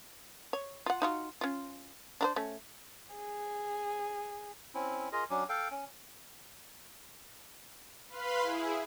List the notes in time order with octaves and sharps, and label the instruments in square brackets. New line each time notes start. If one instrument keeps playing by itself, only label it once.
[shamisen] C#5
F4 F#5
D#4 F4 F#4
C#4 F4
D4 A#4 C5
A3 C#4
[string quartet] G#4
[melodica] C4 C#4 E4
F4 G#4 A#4 D#5
F#3 C#4 D4
A4 F5 G5
C#4
[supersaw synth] B4 F5 B5 C6
E4 G#4